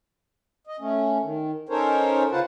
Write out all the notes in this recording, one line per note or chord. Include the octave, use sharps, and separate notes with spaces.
D#5
A3 C#4
D#3
C#4 D#4 A4 A#4 C5 C#5
C#3 F4 B4 C5 F#5 A5